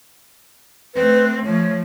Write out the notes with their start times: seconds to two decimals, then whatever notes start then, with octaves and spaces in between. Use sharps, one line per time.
0.95 A3 C4 B4
1.45 F3 A3 C#5